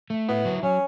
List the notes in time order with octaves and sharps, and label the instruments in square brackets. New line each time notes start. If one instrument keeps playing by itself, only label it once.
[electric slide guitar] A3
[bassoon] B3 [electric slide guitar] E4
[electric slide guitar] F#3
[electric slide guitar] F#3 [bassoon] C#4